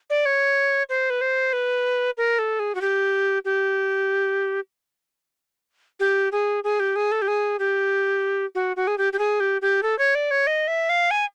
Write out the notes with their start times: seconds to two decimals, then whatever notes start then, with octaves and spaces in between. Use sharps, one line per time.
0.10 D5
0.25 C#5
0.89 C5
1.10 B4
1.21 C5
1.53 B4
2.17 A#4
2.39 A4
2.59 G#4
2.75 F#4
2.81 G4
3.45 G4
6.00 G4
6.32 G#4
6.64 G#4
6.80 G4
6.96 G#4
7.12 A4
7.22 G4
7.28 G#4
7.59 G4
8.55 F#4
8.76 F#4
8.87 G#4
8.98 G4
9.13 G4
9.19 G#4
9.40 G4
9.62 G4
9.83 A4
9.99 C#5
10.15 D5
10.31 C#5
10.47 D#5
10.67 E5
10.89 F5
11.11 G#5